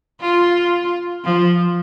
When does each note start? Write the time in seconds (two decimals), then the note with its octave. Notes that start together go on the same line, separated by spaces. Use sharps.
0.21 F4
1.24 F3